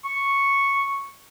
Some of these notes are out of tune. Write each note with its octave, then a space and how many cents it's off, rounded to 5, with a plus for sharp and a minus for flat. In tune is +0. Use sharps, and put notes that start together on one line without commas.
C#6 -5